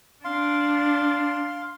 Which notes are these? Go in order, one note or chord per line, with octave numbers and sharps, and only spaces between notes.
D4 F5 C6